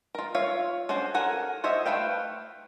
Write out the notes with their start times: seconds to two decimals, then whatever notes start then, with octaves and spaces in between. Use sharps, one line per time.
0.15 F4 A#4
0.35 F4 C#5 E5 F5
0.89 C#4 D4 F#4 C5
1.14 A4 A#4 F#5 G#5
1.64 C5 C#5 D#5 E5
1.86 A3 B4 F5 G5